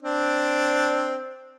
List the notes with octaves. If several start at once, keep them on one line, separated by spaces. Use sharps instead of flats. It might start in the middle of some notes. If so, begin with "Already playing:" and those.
C4 D4